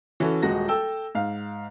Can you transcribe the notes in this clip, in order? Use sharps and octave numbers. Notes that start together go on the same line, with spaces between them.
E3 C#4 F#4 A4
D#1 G#3 F#4 A#6
A4 G5 A5 E6
G#2 F5